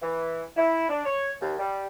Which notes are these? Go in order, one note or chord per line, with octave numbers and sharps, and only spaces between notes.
E3
E4
D4
C#5
D#2
G3